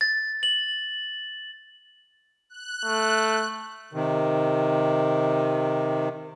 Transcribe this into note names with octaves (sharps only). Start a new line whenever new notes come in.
A6
F#7
F#6
A3
C3 D#3